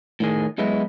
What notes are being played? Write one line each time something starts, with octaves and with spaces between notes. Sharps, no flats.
A2 D#3 G#4
F#2 G#3 B3 E4